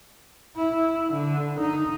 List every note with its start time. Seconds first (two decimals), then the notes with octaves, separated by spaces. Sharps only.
0.56 E4
1.13 D3
1.60 D#4